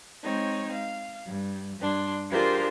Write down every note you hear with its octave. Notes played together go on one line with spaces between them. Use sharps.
G#3 C4 D#4 C#5
F5
G2
G2 D4 C6
D4 F4 G4 G#4 A#4 C5